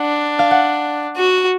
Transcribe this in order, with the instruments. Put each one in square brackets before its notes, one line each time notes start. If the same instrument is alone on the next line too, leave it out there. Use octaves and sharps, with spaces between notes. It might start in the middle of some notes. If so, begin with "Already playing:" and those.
Already playing: [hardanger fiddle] D4 [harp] F#5
[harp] F5
F#5
[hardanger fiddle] F#4